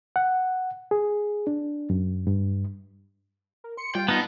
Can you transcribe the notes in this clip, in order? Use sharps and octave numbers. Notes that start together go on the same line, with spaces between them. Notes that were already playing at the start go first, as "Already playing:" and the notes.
F#5
G#4
D4
F#2
G2
A#4
C6 C#7
G3 F4 G5
B3 D#4 B4 A5